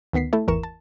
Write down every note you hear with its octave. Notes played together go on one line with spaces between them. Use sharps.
D2 D#3 B3 B6 C7
A3 E4 A4
G#1 E2 E3 A#4 C#6 E7
A5